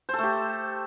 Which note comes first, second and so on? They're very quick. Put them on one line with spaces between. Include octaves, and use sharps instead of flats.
C5 A4 A3 G4